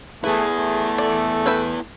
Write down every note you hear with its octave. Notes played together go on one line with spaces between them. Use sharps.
A3 B3 E4 G#4 B4
A3
A4 D5
B4 E5 G5